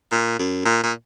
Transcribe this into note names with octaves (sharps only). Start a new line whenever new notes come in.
A#2
F#2
A#2
A#2